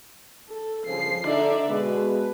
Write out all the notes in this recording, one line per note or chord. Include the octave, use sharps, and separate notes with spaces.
A4
G2 C#3 F3 C7
D3 D#4 D5 E5
B2 G#3 B4